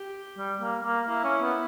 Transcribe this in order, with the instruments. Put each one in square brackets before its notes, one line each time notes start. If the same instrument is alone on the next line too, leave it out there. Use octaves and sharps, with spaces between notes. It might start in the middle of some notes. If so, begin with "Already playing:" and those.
Already playing: [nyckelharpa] G4
[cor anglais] G3
A#3
A#3
[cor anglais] A#3 [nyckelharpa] E4
[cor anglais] C#4
B3